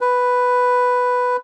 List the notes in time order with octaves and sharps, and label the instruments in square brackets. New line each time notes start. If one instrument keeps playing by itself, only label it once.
[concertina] B4